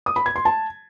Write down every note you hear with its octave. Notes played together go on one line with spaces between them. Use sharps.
D#6
B5
G#6
C6
A5